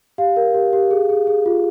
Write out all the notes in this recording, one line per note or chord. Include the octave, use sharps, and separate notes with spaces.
G4 F5
A#4
G4
G4
G#4
G#4
G#4
F4